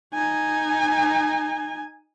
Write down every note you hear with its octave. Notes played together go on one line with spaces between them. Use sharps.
D#4 G#5